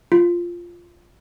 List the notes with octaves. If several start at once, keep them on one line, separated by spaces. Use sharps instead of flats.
F4